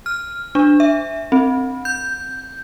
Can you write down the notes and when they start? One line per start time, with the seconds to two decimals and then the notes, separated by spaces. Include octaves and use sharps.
0.06 F6
0.55 D4
0.80 E5
1.32 C4
1.85 G6